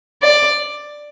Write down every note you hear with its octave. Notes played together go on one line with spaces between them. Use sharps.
D5